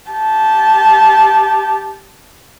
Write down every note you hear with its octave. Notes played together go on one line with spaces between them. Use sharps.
G4 A5